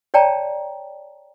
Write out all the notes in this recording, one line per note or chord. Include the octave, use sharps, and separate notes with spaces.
C#5 D5 G5 A5 A#5